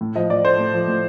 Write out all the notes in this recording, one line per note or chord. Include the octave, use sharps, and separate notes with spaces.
A2
F3 D#5
A2 D5
A3 C5
A2
F3
A2